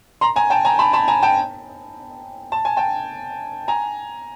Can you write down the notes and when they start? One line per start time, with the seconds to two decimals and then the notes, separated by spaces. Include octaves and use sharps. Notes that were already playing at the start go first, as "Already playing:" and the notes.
0.21 A#5 C6
0.36 G#5 A#5
0.50 G5 A5
0.65 G#5 A#5
0.79 A5 B5
0.93 A5 B5
1.08 G#5 A#5
1.22 G5 A5
2.52 A5
2.65 G#5
2.77 G5 A5
3.68 G#5 A#5